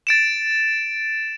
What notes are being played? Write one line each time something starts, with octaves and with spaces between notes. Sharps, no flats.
A6 D7 E7